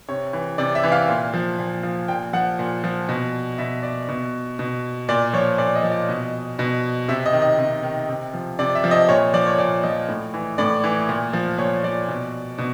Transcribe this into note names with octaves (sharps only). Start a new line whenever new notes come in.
C3 C#5
E3
C3 D5
E5
E3
F5
A#2
F3
A#2
F3
A#2 G5
F3 F#5
A#2
F3
B2
B2 E5
D5
B2
B2
A#2 D5
F3 C#5
A#2 D5
D#5
F3
D5
B2 D#5
B2
C3 E5
D#5
D#3
D#5
C3
D#3
C3
F3
C3 D5
E5
F3
D#5
A#2 C#5
F3 D5
C#5
A#2 D5
F3 D#5
A2
E3
A2 D5
E3
A#2
F3
A#2 C#5
F3 D5
B2
B2